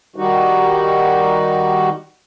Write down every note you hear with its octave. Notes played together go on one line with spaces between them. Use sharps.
D#3 G3 D#4 F#4